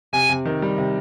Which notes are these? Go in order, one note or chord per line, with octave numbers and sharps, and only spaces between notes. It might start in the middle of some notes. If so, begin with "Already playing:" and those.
C3 G#5
C3
D#3
G3
C3